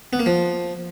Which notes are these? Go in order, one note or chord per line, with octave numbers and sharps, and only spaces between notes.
B3
A#3
F3